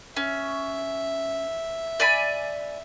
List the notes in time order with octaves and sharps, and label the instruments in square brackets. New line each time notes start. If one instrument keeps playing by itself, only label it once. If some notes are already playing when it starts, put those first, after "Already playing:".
[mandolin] C#4 [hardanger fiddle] E5
[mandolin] D5 G#5 B5